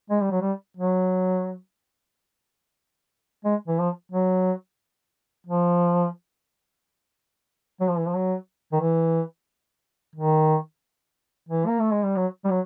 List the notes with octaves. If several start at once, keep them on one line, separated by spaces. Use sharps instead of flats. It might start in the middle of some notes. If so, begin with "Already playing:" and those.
G#3
G3
F#3
G3
F#3
G#3
E3
F3
F#3
F3
F#3
F3
E3
F3
F#3
D#3
E3
D#3
E3
A#3
A3
G#3
G3
F#3
G3
F#3